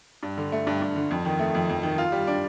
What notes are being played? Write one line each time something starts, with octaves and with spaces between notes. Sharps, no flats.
G2
D3
A3
G2
G2
D3
F2
D#3
A3
F2
F2
D#3
F4
G3
D4